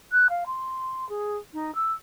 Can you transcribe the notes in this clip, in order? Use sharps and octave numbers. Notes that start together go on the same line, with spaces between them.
F#6
F5
C6
G#4
D#4
E6